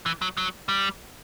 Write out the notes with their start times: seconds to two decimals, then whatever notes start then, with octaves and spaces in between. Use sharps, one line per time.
0.06 E3
0.22 F#3
0.37 F#3
0.69 G3